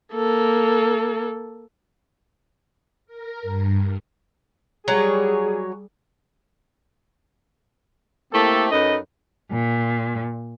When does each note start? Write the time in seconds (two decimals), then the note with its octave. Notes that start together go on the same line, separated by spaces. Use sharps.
0.14 A#3 A4
3.06 A#4
3.42 G2
4.88 F#3 G3 G#4 C#5
8.32 A3 A#3 C4 E4 G4 A4
8.71 F#2 C#4 D#4 A4 B4 D#5
9.50 A#2